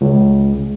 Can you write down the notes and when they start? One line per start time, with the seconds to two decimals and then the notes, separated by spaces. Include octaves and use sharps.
0.01 C#2